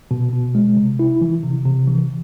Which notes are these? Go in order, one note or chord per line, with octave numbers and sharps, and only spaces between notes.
B2
B2
G#3
C3
E4
E3
C3
C3
E3